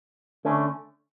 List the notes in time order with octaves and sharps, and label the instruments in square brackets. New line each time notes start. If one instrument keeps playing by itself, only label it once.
[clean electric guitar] D3 A3 C#4